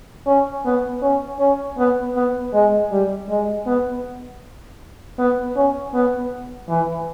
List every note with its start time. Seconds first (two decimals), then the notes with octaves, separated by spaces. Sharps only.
0.26 C#4
0.65 B3
1.02 C#4
1.39 C#4
1.78 B3
2.15 B3
2.53 G#3
2.91 G3
3.29 G#3
3.66 B3
5.18 B3
5.56 C#4
5.94 B3
6.68 E3